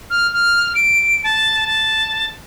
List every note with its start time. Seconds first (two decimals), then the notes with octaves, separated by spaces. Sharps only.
0.10 F6
0.33 F6
0.75 D7
1.24 A5
1.67 A5